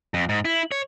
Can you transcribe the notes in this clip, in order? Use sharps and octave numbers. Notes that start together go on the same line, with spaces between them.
F2
G#2
E4
C#5